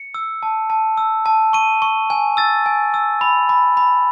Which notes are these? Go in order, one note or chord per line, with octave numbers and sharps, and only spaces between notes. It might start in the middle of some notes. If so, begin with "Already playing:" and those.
Already playing: C#7
E6
A5
A5
E6
A5
C#6 D#7
C#6
G#5
E6 A6
G#5
E6
B5
B5
B5